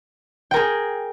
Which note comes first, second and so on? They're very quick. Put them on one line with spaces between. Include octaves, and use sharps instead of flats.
G5 A#4 G#4